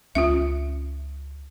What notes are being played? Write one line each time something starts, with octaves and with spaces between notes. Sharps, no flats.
C#2 C#4 F4 E5